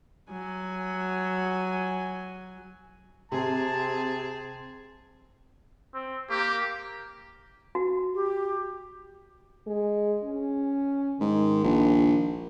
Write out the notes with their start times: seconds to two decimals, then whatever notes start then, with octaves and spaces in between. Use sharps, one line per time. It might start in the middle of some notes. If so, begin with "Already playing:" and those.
0.30 F#3 G#5
3.32 C3 C4 G#4 A5
5.94 C4
6.30 A#3 G4
7.75 F#4
8.14 G4
9.67 G#3
10.25 C#4
11.20 G#2 D#3
11.64 A#1